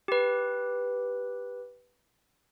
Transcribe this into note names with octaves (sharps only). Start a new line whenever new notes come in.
G4 B4